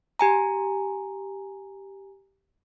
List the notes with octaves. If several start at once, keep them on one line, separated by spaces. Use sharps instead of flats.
G4 G#5 A#5